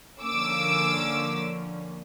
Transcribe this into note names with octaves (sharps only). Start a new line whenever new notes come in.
D3 F3 A#3 C#4 D6 E6